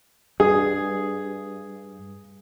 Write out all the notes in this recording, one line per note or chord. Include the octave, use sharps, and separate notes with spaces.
G2 G#4